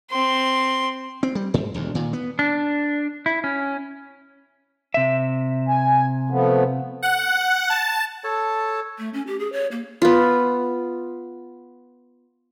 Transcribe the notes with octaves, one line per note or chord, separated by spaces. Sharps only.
C4 C6
C4
G3
G#2
E1 D2
A#2 D#3
B3
D4
E4
C#4
C3 E5
G#5
F3 A3 B3
F#5
A5
A4 C#5 A5
A3
C#4
G4
G#4
C#5
A#3
B3 F4